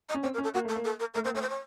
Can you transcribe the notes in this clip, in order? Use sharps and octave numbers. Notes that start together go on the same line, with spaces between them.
D#5
C#4
C4 C#5
A#4
C#4
A4
A#3 F#4
A3 A4
A#3
A4
A#4
A3 A#4
A#3 C5
A3 C#5
C5
C#5